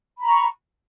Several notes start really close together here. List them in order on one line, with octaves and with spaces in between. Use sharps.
B5 A#5 C#6